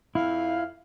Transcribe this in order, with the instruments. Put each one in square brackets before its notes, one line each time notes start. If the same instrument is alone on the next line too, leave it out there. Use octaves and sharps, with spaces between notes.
[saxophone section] F2 F5 [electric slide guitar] E4